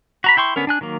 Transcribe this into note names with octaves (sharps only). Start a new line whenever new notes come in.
F#4 A#5 B5
E4 G5 C6 C#6
D3 B3 C#4 A#4
D4 G#5 F#6
D#3 F#3 A#3